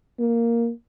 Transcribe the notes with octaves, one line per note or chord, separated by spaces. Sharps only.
A#3